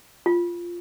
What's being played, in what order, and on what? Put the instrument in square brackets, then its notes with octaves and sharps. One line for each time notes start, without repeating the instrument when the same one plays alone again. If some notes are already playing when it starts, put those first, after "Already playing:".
[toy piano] F4